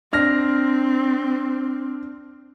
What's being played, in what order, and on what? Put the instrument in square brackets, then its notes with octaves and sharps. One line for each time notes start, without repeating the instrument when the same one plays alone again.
[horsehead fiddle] C4 [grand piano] D4 F6 A#6